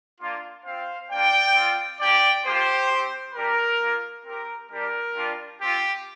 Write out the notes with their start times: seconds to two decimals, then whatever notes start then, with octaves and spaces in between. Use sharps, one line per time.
0.21 A#3 D4 F4
0.65 C4 F4 C5 F5
1.10 A#3 D4 F4 D5 G5
1.55 C4 F4
2.00 A#3 D4 G4 D5 G5
2.45 A#3 F4 G4 C5
2.90 C4 G4
3.35 G3 D4 G4 A#4
3.80 A#3 F4
4.25 C4 G4 A#4
4.70 G3 D4 G4 A#4
5.15 G3 D4 F4
5.60 C4 F4 G4